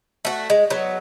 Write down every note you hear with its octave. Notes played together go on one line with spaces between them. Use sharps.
A3 F#4
G#3
F#3 B3